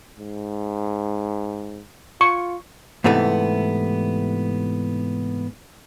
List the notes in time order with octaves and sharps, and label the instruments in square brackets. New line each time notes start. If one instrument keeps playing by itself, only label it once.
[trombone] G#2
[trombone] F4 [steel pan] C#6
[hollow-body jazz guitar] G#2 C3 E3 A3 B3